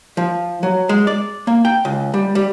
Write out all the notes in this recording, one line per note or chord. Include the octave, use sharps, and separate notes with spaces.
F3
F#3
G#3
D5
A#3
G5
C#2
G3
G3